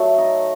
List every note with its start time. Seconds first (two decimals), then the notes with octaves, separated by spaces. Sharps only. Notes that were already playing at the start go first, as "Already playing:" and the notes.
Already playing: F#3 A3 C#5
0.18 D#4